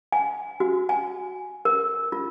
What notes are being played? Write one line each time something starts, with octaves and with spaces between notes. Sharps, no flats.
G#5
F#4
G#5
A#4
F4